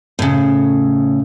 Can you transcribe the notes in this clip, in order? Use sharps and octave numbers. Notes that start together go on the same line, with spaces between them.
A2 C#3